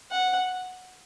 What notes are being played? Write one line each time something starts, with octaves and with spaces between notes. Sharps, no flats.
F#5